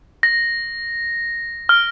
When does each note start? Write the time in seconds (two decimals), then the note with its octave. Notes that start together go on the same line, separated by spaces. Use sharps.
0.23 A#6
1.69 F6